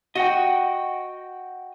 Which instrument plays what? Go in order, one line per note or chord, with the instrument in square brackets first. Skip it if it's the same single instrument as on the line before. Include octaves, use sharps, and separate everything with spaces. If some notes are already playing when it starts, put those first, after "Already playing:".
[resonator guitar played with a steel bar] F#4 [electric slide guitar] D#5 F#5 G5